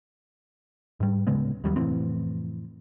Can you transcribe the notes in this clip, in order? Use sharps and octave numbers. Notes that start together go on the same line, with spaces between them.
G#2 G3
D1 C#3 G#3 B3
D#2 F#3 G3
F1 A2 E3 C4